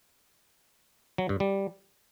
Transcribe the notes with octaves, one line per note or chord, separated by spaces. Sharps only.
F#3
G2
G3